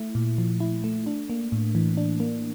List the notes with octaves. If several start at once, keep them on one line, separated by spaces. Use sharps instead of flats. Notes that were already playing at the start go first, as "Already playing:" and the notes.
Already playing: A3 E4
A#2
F3
E4
A3
D4
A#3
A2
E3
D4
A#3